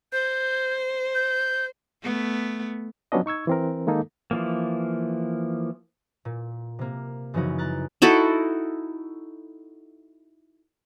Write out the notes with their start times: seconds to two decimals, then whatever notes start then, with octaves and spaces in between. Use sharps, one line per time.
0.12 C5 G6
1.15 G6
2.02 A3 B3
3.12 F3 F#3 B3 C#4 D4 D#5
3.26 D#4 C#6 E6 G#6
3.47 E3 C4 A#4
3.87 D#3 G#3 A#3 D#4 A4
4.31 E3 F3 A#3
6.25 A#2
6.79 C3 A#3
7.34 F#2 C#3 E3 F3 D#4 F#4
7.58 A#5 F#6 A6
8.02 D#4 E4 F#4 A4